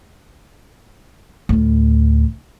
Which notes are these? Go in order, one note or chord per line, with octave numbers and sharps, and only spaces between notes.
D2 A2